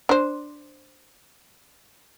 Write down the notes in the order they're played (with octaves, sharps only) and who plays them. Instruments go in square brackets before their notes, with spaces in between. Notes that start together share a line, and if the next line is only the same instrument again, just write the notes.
[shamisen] D4 C5